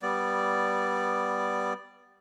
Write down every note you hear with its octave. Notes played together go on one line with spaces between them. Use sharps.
G3 B3 D5